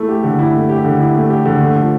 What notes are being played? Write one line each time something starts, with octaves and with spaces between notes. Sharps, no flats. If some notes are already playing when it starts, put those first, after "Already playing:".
Already playing: A3 E4
G4
D3
E4
A3
G4
D3
E4
A3
G4
D3
A3
F3